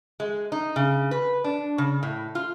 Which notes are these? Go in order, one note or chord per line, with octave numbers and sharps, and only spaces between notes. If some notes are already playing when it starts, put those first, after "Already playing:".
G#3
D#4
C#3
B4
D4
C#3
A2
F4